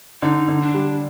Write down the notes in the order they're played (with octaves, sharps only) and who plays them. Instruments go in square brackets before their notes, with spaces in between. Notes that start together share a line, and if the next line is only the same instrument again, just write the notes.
[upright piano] D3 [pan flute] D#4
[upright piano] D3
[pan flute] D4
[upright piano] G3